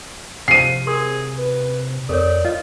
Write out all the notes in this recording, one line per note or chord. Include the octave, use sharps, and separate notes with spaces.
C3 F3 C7 D#7
G#4 A#4 C6 D#6
B4
F2 A4 A#4 C#5 D5
F4 D#5